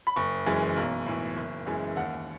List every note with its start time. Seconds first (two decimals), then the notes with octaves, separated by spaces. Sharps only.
0.07 B5
0.16 F#1 C#6
0.46 F#2 E3 G#3
0.76 B1
1.06 A2 E3
1.37 F#1
1.67 F#2 E3 G#3
1.97 D#2 F#5